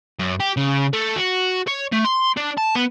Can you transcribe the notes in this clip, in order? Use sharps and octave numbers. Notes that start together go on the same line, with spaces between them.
F#2
G4
C#3
A3
F#4
C#5
A3
C6
D4
A5
B3